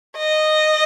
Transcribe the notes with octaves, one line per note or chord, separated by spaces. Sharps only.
D#5